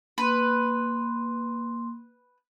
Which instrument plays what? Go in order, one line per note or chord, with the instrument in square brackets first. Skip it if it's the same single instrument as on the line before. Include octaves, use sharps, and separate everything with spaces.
[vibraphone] A#3 C6 [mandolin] B4